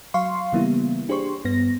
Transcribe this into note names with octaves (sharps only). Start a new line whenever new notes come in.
F#3 F5 C6 C#6
C#3 E3 G3 A#3 B3 E4
D4 G4 G#4 C5 C6 C#6
G2 B3 A#6